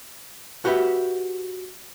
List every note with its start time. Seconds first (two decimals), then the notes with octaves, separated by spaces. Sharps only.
0.65 F#4 G4 B4 E5